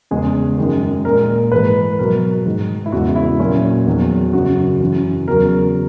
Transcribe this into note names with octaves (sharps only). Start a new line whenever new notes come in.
E2 C#3 G#3 G#4
F#2 D#3 G#3
A#2 G#3 A#4
G#2 E3 G#3 B4
B2 F#3 A#4
G#2 D#3 G#3
E4
E2 C#3 G#3 F#4
E4
A#2 F#3 C#4
E2 D#3 F#3
F#2 C#3 F#3 F#4
F#2 C#3 E3
E2 C#3 F#3 A#4